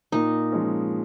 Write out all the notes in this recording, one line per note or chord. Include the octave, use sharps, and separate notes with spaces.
A#2 D#4
F3 G#3 C#4